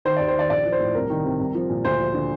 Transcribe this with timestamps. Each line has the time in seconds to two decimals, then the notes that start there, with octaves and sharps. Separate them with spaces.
0.05 D#3 C5
0.17 D5
0.20 D#2
0.28 C5
0.35 D#3 D5
0.50 A#1 D5
0.65 F3
0.72 C5
0.80 A2
0.95 C2 A#4
1.10 D#3
1.25 C3
1.39 C2
1.55 F3
1.70 A#2
1.85 D2 C5
1.99 F3
2.14 D3